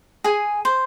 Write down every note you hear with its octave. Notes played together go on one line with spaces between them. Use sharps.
G#4 G#5
C5